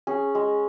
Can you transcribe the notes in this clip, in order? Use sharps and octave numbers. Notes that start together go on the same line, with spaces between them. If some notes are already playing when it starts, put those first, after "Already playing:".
C#4 G#4
G#3